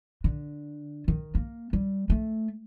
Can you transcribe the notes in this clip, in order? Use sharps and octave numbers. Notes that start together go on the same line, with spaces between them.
D3
D#3
A#3
G3
A3